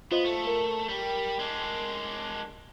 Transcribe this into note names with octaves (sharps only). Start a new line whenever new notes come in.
B3 F4 C5 D#5
A3
A#4
G3
G#3 D4